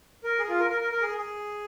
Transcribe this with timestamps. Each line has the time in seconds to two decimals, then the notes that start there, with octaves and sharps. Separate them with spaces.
0.24 A#4
0.39 G#4
0.49 F4
0.60 A#4
0.70 A#4
0.81 A#4
0.92 A#4
1.02 G#4
1.18 G#4